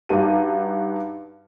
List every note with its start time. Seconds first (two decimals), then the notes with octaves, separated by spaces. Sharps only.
0.09 G2 D#4 F#4 G4 A5 D#7